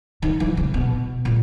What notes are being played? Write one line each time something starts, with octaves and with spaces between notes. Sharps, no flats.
D#3
E3
C#3
B2
A#2